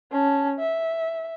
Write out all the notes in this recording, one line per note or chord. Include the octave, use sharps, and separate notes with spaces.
C#4 A5
E5